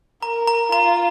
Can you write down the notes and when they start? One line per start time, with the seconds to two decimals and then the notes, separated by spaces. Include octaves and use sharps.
0.23 A#4 A#5
0.47 A#5
0.72 F4 A#5